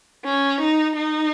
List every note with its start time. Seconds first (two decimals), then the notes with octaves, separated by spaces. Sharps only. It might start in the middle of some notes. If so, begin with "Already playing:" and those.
0.25 C#4
0.60 D#4
0.95 D#4